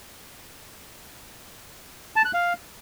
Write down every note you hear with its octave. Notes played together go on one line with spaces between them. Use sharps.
A5
F#6
F5